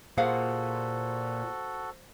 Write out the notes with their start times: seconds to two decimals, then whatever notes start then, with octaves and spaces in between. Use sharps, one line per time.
0.18 A#2 F#4 G#4 A4 C5 F5 F#5